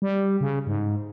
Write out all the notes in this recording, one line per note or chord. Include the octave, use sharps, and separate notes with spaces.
G3
C#3
G#2